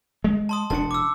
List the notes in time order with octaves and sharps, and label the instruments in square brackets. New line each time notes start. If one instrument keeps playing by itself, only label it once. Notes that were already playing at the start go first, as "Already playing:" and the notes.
[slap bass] G#3
[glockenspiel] A5 C6 D#6
[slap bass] E1 D4 [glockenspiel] A5 C#7
[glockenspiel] D6 E6